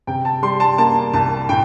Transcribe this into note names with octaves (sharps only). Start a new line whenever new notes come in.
C3 G5
A5
G3 C6
A5
A#3 A5
C2 A5
A2 G5